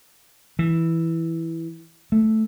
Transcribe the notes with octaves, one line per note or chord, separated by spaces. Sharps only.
E3
A3